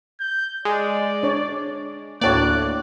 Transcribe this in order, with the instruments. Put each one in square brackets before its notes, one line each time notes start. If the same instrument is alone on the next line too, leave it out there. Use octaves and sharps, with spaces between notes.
[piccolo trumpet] G6
[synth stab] G#3 [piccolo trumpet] D5
[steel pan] D4 C#5
[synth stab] D2 A2 D5 [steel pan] A#3 C#5 [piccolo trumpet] F#6